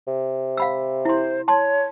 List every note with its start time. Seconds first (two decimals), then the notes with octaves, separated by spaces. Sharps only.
0.08 C3
0.57 F5 B5 E6
1.05 E4 C5 C6
1.48 C#5 A5 C6